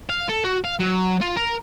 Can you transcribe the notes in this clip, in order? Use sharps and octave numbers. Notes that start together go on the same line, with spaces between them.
F5
A4
F#4
F5
F#3
F4
A#4